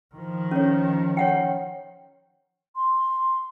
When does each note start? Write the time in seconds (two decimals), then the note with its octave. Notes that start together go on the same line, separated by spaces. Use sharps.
0.15 D#3 F3
0.51 C#4 C#5
1.17 C#5 F#5 G5
2.75 C6